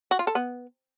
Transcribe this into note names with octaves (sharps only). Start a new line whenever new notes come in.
F#4
F4
A4
B3